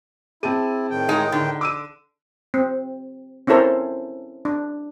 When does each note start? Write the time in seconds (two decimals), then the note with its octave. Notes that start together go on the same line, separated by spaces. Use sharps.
0.43 C4 E4 G#4 A5 D#7
0.90 A2 D#3 G5
1.09 G#3 D#4
1.32 D3 D#4
1.61 D6 E6 D#7
2.54 C4
3.47 C4 C#4 E4 A4 A#4 C5
4.45 D4